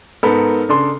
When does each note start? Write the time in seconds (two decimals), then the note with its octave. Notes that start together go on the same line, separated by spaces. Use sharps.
0.23 G#2 B3 A4 A#4 B5
0.69 C#3 D4 A4 C6